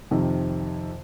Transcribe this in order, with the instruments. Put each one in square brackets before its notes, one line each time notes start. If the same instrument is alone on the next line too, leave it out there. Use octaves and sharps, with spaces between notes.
[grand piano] F2 C3 D#3